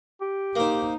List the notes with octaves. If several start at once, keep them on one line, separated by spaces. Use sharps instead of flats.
G4
A#3 D#4 C5